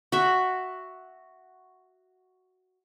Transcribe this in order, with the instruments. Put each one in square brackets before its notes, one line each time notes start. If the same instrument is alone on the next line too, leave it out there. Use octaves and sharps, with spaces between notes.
[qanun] F#4 E5